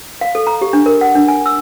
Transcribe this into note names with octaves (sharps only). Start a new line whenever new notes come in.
F5
A4
A#5
G4
D4
A#4
F#5
D4
G#5
E6